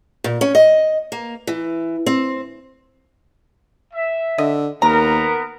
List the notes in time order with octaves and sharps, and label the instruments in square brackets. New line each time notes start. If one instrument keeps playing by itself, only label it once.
[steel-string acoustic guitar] A#2
C#4
D#5
A#3
E3
C4
[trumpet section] E5
[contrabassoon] D3 [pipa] D#5
[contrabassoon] D#2 [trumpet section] B3 A#4 [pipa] A#5